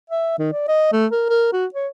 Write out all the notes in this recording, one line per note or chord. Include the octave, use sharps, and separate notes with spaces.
E5
D#3
D5
D#5
A3
A#4
A#4
F#4
C#5